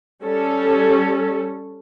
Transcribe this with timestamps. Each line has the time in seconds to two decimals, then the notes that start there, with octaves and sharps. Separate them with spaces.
0.22 G3 C#4 A4